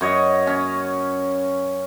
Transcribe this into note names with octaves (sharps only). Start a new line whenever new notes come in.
F#2 C#5 D#5
C#4